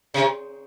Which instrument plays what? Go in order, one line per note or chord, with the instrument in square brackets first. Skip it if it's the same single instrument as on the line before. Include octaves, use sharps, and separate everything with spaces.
[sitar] C3